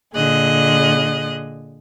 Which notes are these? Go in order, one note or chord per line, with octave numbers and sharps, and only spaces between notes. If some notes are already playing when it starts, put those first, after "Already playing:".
A#2 D3 G#4 D#5 F#6